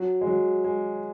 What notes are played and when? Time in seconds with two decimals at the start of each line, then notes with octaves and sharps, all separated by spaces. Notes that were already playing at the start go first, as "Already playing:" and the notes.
Already playing: F#3
0.21 G#3
0.27 F#3
0.64 G#3